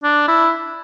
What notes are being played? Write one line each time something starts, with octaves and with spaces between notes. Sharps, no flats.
D4
E4